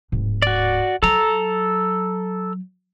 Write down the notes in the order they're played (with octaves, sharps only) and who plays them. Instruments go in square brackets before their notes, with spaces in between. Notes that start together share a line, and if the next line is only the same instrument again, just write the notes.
[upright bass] D1 G#2
[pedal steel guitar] F#4 D5
[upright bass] F#3 [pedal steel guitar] A4 A#5